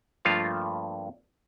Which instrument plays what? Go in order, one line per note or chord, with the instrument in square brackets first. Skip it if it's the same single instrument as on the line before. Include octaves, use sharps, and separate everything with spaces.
[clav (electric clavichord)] G2 F3 A3 A#3 F4 F5